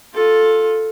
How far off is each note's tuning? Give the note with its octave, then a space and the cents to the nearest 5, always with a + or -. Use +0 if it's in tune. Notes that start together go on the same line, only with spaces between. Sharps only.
F4 +15 A4 +0